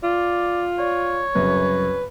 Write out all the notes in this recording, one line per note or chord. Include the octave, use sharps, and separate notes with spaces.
F4 D5
C#5 D5
C2 F#2 C#3 B4